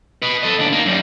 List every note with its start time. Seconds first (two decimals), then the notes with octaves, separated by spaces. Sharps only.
0.22 B4 D#5
0.43 A4 D#5
0.59 D#2 D4
0.72 A#3 D#4
0.86 F#2 G3